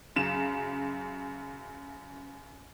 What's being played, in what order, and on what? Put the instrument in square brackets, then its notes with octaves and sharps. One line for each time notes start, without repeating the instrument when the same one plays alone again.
[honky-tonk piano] F#2 C#3 E7